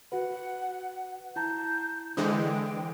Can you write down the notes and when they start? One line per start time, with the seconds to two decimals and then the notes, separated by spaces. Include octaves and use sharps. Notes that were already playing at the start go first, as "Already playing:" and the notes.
0.12 F#4 B4 F#5
1.36 E4 A5 A#5 G6
2.17 D3 E3 G#3 A4 C5 G5 D#6